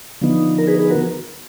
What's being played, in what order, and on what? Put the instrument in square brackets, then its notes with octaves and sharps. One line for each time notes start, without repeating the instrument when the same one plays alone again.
[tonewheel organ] D3 F3 B3 D#4
A#4
G#4 B4
G#4 B4
F#4 A#4